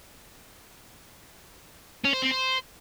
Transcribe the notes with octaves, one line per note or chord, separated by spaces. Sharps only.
C#4
C5
C4
C5